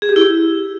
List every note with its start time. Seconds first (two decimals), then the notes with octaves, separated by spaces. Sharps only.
0.02 G#4
0.09 G4
0.16 E4